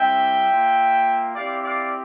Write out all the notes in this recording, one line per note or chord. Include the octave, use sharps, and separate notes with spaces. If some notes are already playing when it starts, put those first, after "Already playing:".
Already playing: G3 C4 E4 G4 E5 G5
A#3 F4
C4 E4 G4 D5 F5
D5 F5